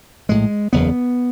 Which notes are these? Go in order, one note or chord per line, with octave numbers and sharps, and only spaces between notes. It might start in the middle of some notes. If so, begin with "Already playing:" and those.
A#1 A2 G#3
F#1 E2 C#3 B3